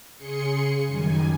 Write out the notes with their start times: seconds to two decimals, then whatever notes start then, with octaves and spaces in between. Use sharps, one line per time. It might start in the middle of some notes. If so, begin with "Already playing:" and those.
0.16 C#3 G#4 C6 C#7
0.86 F#2 D#3 G3 G#5